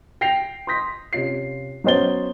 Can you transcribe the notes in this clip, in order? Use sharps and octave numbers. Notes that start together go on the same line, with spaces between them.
G5 A#6 C7 F7
C6 D#6 G6 A#6 B6
C3 C#4 F4 C7
F#3 B3 C#4 C5 A6 G7